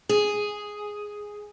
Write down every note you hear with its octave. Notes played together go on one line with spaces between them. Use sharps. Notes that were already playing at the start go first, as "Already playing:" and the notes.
G#4